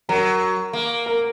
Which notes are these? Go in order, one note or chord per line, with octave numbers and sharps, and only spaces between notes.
F#3 A#4 A#5
A#3
A#4 A#5